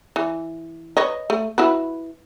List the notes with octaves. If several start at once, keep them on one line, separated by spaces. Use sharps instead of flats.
E3
B4 C#5 D#5
A3
E4 F#4 B4